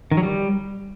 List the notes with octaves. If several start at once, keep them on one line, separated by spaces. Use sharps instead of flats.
D#3
F#3
G3